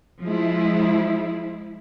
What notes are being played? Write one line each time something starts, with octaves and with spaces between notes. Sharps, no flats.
F3 G#3 E4